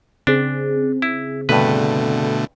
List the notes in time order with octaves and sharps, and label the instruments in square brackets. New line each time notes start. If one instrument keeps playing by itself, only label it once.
[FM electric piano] C#3 C4 G#4 [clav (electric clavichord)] D4
[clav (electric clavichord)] E4
[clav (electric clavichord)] G2 B4 [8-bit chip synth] B2 D3 A3